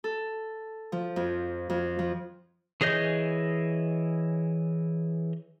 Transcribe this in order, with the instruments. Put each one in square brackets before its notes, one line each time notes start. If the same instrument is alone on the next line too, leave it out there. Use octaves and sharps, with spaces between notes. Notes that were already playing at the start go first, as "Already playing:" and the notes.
[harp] A4
F3
F2
F2
F3
[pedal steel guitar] E3 G#4 C#5 D#5 G6